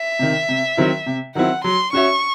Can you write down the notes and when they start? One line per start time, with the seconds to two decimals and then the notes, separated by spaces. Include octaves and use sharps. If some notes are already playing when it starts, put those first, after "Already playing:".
Already playing: E5
0.19 C3 D#3
0.49 C3
0.77 D#3 F#3 C4 E4
1.06 C3
1.35 D#3 F#3 C4 E4 F#5
1.64 F#3 C6
1.93 C#4 F#4 C#5 E5 C#6